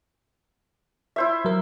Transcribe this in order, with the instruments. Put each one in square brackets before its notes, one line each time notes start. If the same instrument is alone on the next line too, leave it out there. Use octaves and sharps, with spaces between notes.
[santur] E4 C5 E5
[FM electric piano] F#3 A#4